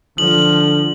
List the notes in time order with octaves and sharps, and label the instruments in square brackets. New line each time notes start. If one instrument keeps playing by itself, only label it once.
[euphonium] D3 [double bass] F3 [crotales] F#7